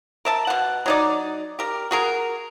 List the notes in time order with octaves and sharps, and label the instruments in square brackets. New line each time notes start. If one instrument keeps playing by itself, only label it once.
[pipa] A#4 E5 A5
B2 F#5
F#3 D#4 D5
G4 A#4
F#4 G#4 A#4